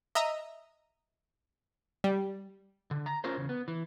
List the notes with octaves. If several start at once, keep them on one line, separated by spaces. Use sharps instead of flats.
D#5 E5 A#5 E6 D#7
G3
D3
A#5
C#4 F4 A#4 C5
E2 C#3
B3
E3